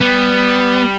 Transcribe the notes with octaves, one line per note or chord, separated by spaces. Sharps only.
G3 B3